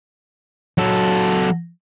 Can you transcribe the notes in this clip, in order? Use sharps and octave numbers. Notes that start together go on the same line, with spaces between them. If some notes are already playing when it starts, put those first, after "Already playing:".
F#3 A4